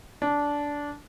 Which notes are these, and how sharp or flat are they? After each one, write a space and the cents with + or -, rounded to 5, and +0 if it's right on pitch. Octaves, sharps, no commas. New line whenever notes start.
D4 -15